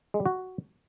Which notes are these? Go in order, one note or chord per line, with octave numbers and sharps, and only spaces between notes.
G#3
G3
F#4